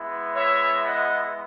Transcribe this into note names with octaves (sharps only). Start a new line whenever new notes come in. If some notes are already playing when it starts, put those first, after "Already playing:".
Already playing: G#3 B3 E4
C#5 E5
D#5 F#5